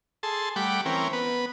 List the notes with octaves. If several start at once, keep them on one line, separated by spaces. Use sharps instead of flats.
G#4 A4 A5 C6
G3 A3 F#5 G5 B5 D6
E3 C4 C#4 A#4 G5
B3 B4